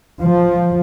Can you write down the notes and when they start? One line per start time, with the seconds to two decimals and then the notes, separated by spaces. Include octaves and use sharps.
0.22 F3